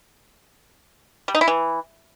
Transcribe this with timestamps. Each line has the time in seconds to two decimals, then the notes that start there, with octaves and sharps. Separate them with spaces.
1.28 G3
1.35 D#4
1.41 E4
1.48 E3